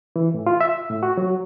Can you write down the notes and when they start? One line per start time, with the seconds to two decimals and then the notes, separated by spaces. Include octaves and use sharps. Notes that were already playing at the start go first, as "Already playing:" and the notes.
0.16 E3
0.34 A2
0.47 F4
0.61 E5
0.90 A2
1.03 F#4
1.18 F#3